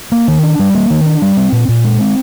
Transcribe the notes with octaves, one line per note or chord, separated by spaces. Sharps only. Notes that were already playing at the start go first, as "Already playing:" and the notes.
A#3
D#3
D4
G3
A#3
D#3
D4
G3
C4
A#2
A#2
G#3
C4